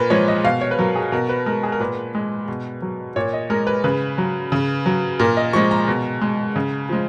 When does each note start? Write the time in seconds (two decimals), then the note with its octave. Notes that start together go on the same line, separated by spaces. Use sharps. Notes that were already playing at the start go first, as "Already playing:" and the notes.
Already playing: A#2 A#4 B4
0.10 F3 G#3 C#5
0.28 D#5
0.44 B2 F5
0.61 C#5
0.71 B4
0.79 F#3 A#4
0.95 G#4
1.12 B2 A#4
1.29 B4
1.46 G#3 A#4
1.63 G#4
1.72 A#4
1.80 A#2 B4
2.15 G#3
2.48 B2
2.82 F#3
3.16 A#2 C#5
3.33 D#5
3.50 G#3 A#4
3.67 B4
3.84 C#3 B4
4.18 F#3
4.52 C#3
4.86 F#3
5.20 A#2 A#4
5.37 D#5
5.53 F3 G#3 C#6
5.71 A#5
5.88 B2
6.21 G#3
6.56 C#3
6.89 F3 G#3